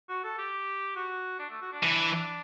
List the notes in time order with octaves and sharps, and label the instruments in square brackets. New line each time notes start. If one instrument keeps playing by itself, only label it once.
[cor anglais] F#4
A4
G4
F#4
D4
A3
F#4
D4
[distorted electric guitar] E3